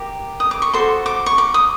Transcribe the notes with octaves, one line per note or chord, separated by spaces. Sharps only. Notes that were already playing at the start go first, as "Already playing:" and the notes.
Already playing: G4 A#4
D#6
D6
C#6
F#4 A4 C5 C6
D6
C#6
D6
D#6